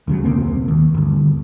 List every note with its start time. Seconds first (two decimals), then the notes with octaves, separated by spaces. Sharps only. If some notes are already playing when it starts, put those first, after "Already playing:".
0.07 D2 C#3 F#3
0.24 E1 C#2 A#3 C4
0.68 D#2
0.94 G1 D2